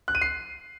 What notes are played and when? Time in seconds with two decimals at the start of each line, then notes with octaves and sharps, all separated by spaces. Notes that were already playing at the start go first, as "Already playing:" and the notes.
0.08 F#6
0.15 D#7
0.22 C7